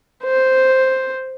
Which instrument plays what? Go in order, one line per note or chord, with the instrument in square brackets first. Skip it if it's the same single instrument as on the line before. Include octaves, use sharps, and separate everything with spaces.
[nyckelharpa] C5